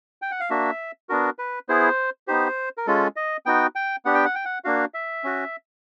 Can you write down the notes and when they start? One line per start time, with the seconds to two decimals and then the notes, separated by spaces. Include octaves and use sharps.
0.22 G5
0.31 F#5
0.40 F5
0.50 A#3 D4 F#4 E5
1.09 B3 D4 F#4 A#4
1.39 B4
1.69 B3 E4 G#4 C5
2.27 B3 D#4 G4 C5
2.78 A#4
2.87 G#3 C#4 F4 A4
3.16 D#5
3.46 B3 D#4 F#4 G5
3.75 G5
4.05 B3 D4 G4 F#5
4.15 G5
4.25 F#5
4.35 G5
4.45 F#5
4.64 A#3 D4 F#4 F5
4.94 E5
5.24 C#4 F#4